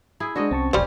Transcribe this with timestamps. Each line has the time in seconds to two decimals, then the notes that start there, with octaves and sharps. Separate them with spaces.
0.20 E4 G#4
0.36 G#3 D4 F#4 C5 D#5
0.51 C2 C4 C#4 A5 C#6
0.73 E1 B1 F2 G3 C#4 G4 C5